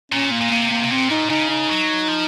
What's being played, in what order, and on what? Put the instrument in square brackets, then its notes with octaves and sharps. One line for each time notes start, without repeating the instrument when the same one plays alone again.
[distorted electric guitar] A#2 [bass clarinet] C#4
[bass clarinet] A#3
[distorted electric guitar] A#2
[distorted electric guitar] C3 [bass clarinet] A#3
[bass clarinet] A#3
[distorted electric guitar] C3
[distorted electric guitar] A#2 [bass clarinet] C4
[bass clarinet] D#4
[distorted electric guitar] C#3 [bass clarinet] D#4
[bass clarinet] D#4
[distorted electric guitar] F#3
F3